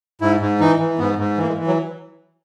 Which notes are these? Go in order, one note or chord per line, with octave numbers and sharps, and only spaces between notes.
G#2 E4
G#2
E3 D#4
E3
G#2 B3
G#2
E3 A#3
G#3
E3
F#3